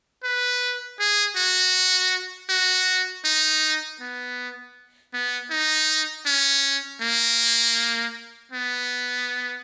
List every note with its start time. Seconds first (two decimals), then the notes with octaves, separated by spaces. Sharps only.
0.23 B4
0.99 G#4
1.36 F#4
2.49 F#4
3.25 D#4
4.00 B3
5.13 B3
5.50 D#4
6.26 C#4
7.01 A#3
8.52 B3